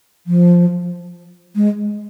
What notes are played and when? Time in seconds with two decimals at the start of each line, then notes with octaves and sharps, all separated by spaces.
0.27 F3
1.56 G#3